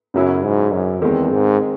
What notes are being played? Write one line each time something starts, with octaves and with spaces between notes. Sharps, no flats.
F#2 C#3 F#3 C#4 E4
G#2
F#2
E2 D#3 G#3 C4
G#2